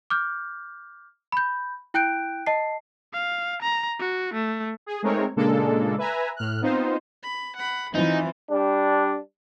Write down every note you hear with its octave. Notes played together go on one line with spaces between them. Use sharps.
D6 F6 G6
B5 G6
E4 G5 F#6 G6 D7
D#5 A5 C7
F5
A#5
F#4
A3
G#4
G#3 A3 C4 D#4 A#4 C#5
A#2 C#3 G#3 A#3 D4 A4
B4 E5 G#5 A#5
A2 F6 F#6
B3 C4 D#4 F4 C5
B5
F#5 B5
E3 C4 D#4 F4
G3 D4